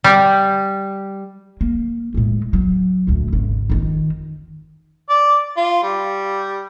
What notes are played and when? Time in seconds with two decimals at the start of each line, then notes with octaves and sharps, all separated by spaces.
0.04 G3
1.61 A#3
2.14 A2 G#3
2.53 F#3
3.07 D2 A2
3.33 G#1 C#3
3.70 F2 D#3
5.10 D5
5.57 F4
5.83 G3